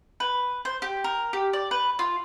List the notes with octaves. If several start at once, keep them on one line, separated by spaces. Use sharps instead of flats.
B4
C5
G4
A#4
G4
D5
B4
F4